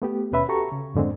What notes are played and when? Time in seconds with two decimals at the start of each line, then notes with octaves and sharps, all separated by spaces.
0.02 A3 B3 G4
0.32 D#2 B2 C#4 B4 E5 B5
0.49 F#4 G4 A4 A#5 C#6
0.72 C#3
0.94 F2 G#2 D3 G#3 C4